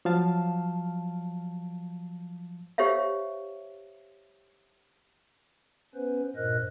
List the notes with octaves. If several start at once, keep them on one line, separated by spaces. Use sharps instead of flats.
F3 F#3 F5 A5
G4 C5 C#5 E5 F5
B3 C#4 B4 C5
G2 A#2 A#4 C5 D#5 F#6